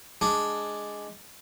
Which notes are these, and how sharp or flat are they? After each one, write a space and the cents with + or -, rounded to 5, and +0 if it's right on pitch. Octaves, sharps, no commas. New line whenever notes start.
G#3 +0 D4 +0